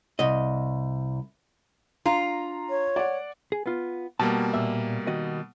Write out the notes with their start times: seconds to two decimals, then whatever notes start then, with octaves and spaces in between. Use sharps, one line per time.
0.19 C2 D#5
2.06 D4 F4 A#5
2.70 C#5
2.96 D5 F#5
3.52 G#4
3.66 B3 F4
4.19 B2 G3 A#3 A5
4.54 A#2 E5
5.07 D#3 F#4 D#5